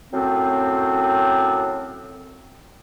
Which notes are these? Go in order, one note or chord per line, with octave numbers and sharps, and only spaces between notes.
F#2 A2 C4